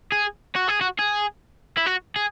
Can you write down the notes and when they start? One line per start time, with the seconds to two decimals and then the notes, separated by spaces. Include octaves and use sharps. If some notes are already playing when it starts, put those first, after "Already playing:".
0.12 G#4
0.56 F#4
0.69 G#4
0.82 F#4
0.99 G#4
1.77 E4
1.86 F#4
2.16 G#4